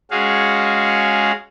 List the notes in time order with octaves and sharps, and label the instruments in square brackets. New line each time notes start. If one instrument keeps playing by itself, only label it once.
[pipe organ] G#3 C#4 F#4 G#4 F5